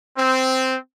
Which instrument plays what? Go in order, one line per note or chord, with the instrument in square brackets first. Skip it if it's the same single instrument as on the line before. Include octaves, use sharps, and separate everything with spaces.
[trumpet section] C4